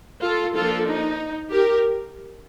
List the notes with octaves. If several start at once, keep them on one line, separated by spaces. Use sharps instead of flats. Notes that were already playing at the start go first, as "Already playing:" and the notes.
F4 A4
F3 A#3 D4 F4 A4
D#4
G4 A#4